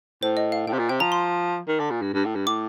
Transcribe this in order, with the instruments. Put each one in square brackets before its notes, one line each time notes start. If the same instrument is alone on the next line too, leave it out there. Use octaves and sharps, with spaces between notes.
[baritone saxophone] A2 [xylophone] C5
[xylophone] D#5
F5
[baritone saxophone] A2 [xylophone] G5
[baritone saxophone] C3
A#2
[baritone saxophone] C3 [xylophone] G5
[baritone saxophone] F3 [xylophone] A#5
[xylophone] C6
[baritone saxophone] D#3
D3
A#2
G2
G2
A2
G2
[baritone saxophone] A2 [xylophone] D6